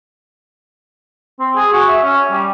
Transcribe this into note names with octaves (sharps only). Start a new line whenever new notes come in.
C4
G#4
F#4
E5
C#4
G3